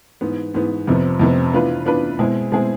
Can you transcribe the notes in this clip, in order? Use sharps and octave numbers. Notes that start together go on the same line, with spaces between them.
G#2 E3 B3
G#2 E3 B3
F2 C3 F3 B3
F2 C3 F3 B3
E3 B3 D4 F4 B4
E3 B3 D4 F4 B4
B2 G#3 C4 E4 G#4
B2 G#3 C4 E4 G#4